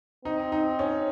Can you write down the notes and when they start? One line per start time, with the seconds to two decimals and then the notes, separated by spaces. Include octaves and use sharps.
0.25 C4 D#4
0.52 D#4
0.79 C#4